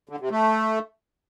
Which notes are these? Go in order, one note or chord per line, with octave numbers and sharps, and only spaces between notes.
D3
C3
A3